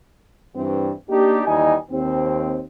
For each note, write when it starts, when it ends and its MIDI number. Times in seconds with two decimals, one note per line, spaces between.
0.55 0.92 43
0.55 0.92 52
0.55 0.92 60
1.10 1.42 58
1.10 1.42 62
1.10 1.42 63
1.10 1.42 67
1.46 1.76 39
1.46 1.76 52
1.46 1.76 55
1.46 1.76 63
1.46 1.76 75
1.46 1.76 80
1.91 2.63 39
1.91 2.63 60